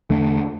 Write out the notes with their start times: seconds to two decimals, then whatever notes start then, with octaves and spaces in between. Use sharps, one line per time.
0.10 E2 D3 A3 D4